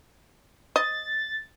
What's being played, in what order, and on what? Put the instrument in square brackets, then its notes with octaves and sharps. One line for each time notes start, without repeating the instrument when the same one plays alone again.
[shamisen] D#5 [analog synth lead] A6